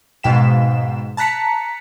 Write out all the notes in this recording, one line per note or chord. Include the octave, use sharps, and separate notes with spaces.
G#2 B2 F5 G5 B6 E7
A5 A#5 F#6 B6 C#7